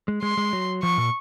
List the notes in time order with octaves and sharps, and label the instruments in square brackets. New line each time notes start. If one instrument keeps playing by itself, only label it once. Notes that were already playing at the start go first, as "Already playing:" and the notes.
[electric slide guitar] G#3
[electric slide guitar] G#3 [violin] C6
[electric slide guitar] G#3
F#3
[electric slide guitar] F3 [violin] C#6
[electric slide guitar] A#2